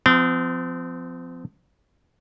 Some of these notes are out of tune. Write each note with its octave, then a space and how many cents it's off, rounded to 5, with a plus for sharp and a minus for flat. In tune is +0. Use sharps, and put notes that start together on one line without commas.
F3 +0 C4 -35